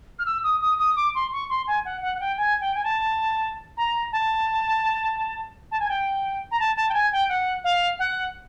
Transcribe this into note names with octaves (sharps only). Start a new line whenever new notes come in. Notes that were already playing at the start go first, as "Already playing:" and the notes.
F6
E6
D#6
D#6
D#6
D6
C6
C#6
C6
G#5
F#5
F#5
F#5
G5
G#5
G5
G#5
A5
A#5
A5
A5
G#5
G5
A#5
A5
A5
G5
G#5
G5
F#5
F5
F#5